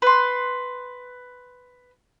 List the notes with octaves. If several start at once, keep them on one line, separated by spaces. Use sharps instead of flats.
B4 C6